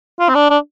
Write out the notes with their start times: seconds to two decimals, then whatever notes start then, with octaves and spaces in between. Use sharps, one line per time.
0.20 F4
0.29 C4
0.35 D4
0.50 D4